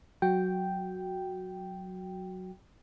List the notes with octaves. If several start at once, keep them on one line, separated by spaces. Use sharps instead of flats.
F#3 F#4 G5